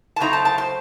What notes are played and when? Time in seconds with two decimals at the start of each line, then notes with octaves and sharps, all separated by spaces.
0.16 A5
0.20 C#3 F#3 A3 C4 D#4 A#5
0.33 A5
0.45 A5
0.58 C5